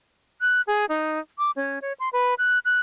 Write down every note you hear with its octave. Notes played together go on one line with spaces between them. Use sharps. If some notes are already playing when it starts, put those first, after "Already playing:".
F#6
G#4
D#4
D6
C#4
C#5
C6
B4
F#6
F#6